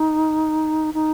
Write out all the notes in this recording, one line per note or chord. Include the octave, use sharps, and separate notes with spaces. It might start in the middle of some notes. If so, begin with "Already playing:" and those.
Already playing: D#4
D#4